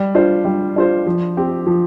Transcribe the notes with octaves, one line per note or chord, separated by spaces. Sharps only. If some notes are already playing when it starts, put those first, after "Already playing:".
Already playing: G3
D4 F4 C5
G3
D4 F4 C5
F3
C4 G4
F3